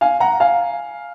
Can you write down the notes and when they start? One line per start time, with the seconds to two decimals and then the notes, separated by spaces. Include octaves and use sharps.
0.01 F5 G#5
0.20 F#5 A#5
0.40 F5 G#5